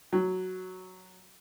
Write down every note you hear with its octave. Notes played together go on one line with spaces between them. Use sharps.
F#3